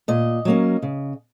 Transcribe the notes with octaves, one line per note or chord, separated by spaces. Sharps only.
A#2 D#5
F#3 A#3 C#4
C#3